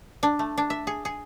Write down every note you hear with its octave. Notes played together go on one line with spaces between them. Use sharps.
D4
A3
D4
E5
G#4
G#4